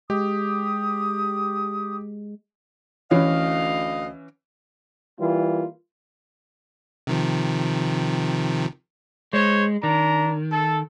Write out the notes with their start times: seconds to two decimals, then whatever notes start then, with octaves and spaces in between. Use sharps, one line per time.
0.10 G#3 G4 D#6
3.11 D2 E3 C#4 D#5 F5
5.20 E3 G3 A#3 F4
7.07 C3 D#3 F3
9.33 G#3 C5 C#5
9.83 D#3 D4 A#5
10.52 A4